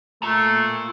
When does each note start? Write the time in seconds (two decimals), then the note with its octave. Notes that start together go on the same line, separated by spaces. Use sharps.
0.23 A3 F4 A#5